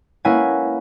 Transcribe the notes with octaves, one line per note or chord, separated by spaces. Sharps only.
A#3 C#4 E4 B4 F#5 G#5